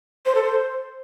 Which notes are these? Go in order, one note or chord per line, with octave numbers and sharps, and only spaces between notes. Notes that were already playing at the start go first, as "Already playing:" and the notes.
C5
A4
C5